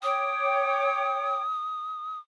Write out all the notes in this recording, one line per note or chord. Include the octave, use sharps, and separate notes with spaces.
C#5 G5 D6 D#6